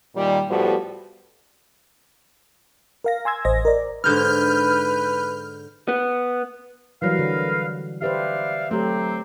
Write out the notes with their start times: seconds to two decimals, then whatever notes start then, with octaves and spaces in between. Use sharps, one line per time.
0.15 A#2 D#3 G3
0.48 A2 F3 G3 B3 F#4 A4
3.04 A#4 F5 A#6
3.25 G#5 C6 E6 G#6
3.45 A1 C5 D#5 A#6
3.65 A#4 D5
4.04 G#2 D3 D#4 B4 F6 G6
5.88 B3
7.02 E3 F#3 G3 A#4 B4 F5
7.19 D3
8.02 G4 B4 C5 D5 E5 F5
8.71 F#3 A3 C4 G4